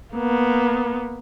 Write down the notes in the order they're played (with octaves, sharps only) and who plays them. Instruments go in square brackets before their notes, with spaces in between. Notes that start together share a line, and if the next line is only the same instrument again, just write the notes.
[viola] A#3 B3